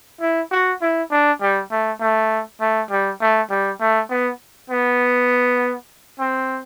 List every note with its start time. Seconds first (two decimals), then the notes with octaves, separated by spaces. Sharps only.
0.21 E4
0.52 F#4
0.82 E4
1.11 D4
1.41 G3
1.71 A3
2.00 A3
2.61 A3
2.91 G3
3.21 A3
3.50 G3
3.81 A3
4.10 B3
4.70 B3
6.19 C4